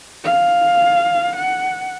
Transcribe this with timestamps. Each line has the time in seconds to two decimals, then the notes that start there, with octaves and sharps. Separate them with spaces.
0.25 F5
1.36 F#5